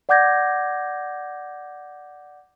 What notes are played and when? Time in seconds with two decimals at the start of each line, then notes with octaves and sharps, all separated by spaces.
0.09 D5 F#5 D6 G6 G#6 A#6